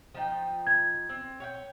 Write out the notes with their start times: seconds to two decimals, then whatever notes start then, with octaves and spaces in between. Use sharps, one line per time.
0.14 F3 D#4 G5
0.67 G#6
1.09 C4
1.40 C#5 F#5 G5